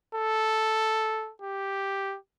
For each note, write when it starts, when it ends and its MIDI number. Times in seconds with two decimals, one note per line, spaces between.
0.15 1.32 69
1.42 2.16 67